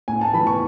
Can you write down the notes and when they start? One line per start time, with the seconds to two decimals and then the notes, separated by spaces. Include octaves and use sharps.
0.08 A2 G#5
0.21 A5
0.34 E3 B5
0.47 C#6